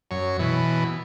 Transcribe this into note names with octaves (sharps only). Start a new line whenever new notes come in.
F#2 C#5
B2 E3